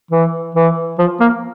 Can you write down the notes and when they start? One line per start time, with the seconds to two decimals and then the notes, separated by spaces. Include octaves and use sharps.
0.11 E3
0.55 E3
0.99 F3
1.20 A#3